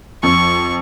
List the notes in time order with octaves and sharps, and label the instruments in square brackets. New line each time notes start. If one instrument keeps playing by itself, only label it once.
[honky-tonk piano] F2 [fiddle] C#6